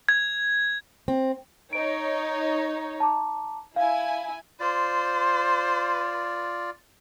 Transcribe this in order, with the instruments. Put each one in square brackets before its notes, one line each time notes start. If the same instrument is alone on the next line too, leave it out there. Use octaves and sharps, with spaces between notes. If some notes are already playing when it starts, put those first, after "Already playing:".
[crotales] G#6
[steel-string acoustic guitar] C4
[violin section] D#4 C#5 [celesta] D7
[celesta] A5 A#5 D6
[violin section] E4 G#5 [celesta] F5
[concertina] F4 D5 [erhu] C5